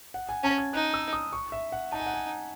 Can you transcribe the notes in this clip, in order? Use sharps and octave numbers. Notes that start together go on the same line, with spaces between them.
F#5
G#5
C#4 A5
G#6
D#4 F#6
E6
D#6
C#6
E5
F#5
D#4 A5
G#5
F#5
G#5